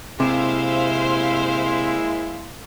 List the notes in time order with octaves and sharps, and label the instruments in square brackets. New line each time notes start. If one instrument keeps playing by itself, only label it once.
[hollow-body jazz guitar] C3 [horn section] G#3 A#3 E4 [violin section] C5 E5 F5